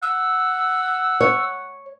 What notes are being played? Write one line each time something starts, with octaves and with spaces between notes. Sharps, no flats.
F#5 E6
C#5